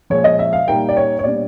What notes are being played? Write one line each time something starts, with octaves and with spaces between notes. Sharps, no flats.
A#2 F3 G#3 C#5
D#5
E5
F5
A#2 G3 A#3 D#4 G5
D5
C#5
C#5
A#2 G3 B3 D4 D5